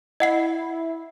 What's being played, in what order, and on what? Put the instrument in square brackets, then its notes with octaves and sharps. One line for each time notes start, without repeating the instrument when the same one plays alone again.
[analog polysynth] E4 [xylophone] D#5 F#5 C7